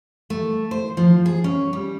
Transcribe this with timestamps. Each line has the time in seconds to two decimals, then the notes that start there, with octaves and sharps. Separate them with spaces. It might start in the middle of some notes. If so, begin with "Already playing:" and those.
0.30 A3
0.71 C5
0.97 F3
1.26 G#4
1.44 C#4
1.73 G3